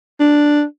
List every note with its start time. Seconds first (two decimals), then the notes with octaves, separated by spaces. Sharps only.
0.20 D4